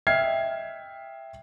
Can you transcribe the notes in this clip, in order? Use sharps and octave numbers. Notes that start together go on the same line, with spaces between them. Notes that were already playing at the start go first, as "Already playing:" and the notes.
D#5 E5 G5 F6 G#6 C7